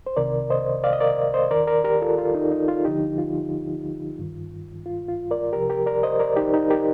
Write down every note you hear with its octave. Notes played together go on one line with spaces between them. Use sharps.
C5
C2 C3 D#3 A#4 D5
C5 D#5
D5 F5
D#5
A#4 D5
C5 D#5
D#2 D#3 A#4 D5
A#4 D5
G4 A#4
F4 A4
F4
D#4
D#4
F4
D2 D3 F3 D#4 G4
F4
G2 D#3
F4
F4
A#4 D5
C2 C3 F3 G4 A#4
G4 A#4
A#4 D5
C5 D#5
A#4 D5
D#4 G4
D#4 G4
G4 A#4